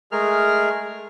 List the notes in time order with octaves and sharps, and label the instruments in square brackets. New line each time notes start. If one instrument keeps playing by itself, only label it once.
[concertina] G#3 A3 G#4 A#4 F6